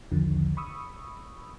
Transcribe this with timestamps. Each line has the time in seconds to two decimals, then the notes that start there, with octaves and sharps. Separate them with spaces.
0.12 B1 E2 D3 D#3 F3
0.57 B5 C#6 D#6 E6